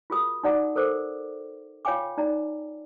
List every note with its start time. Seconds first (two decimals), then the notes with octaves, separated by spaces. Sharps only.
0.10 F4 F#4 G#4 A#4 D#6
0.43 D#4 F#4 D5 F#5 A#5 D6
0.76 A4 A#4 C5 D6
1.85 F4 C#5 F5 G5 G#5 D6
2.17 D#4 D5 A#5